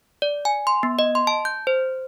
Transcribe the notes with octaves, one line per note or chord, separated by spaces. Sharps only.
D5
G#5
C6
B3
D#5
C6
A5
G6
C5